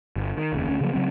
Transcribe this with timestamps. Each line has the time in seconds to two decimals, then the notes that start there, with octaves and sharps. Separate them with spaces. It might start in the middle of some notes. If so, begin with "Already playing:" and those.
0.16 G1
0.37 D#3
0.53 F1 D#2 C#3
0.69 D2 C#4
0.81 C#3 F3 F#3 A#3
0.93 C#3 F#3 C4